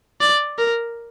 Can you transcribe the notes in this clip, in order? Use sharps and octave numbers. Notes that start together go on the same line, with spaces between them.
D5
A#4